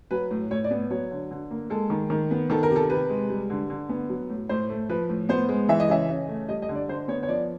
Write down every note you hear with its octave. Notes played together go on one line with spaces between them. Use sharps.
F#3 B4
A2
A2 C#5
D5
B3
F#3 C#5
D3
D3
A#3
G#3 A4
D#3
D#3
B3
D#3 A4
A#4
C3
A4
C3 B4
G#3
G3
D3
D3
B3
F#3
A2
A2 C5
A3
F3 B4
A2
B3 C5
G#3
E3 E5
D#5
C#3 E5
C#3
A3
G3 D#5
D#5
D3
D5
D3 C5
B3 C#5
C#5
F3 D5